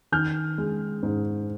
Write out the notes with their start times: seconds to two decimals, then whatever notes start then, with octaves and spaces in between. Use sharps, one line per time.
0.12 D#3 F6 G6
0.58 G#3
1.03 G#2